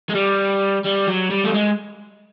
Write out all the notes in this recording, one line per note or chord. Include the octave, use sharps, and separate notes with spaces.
G#3
G3
G3
F#3
G3
A3
G#3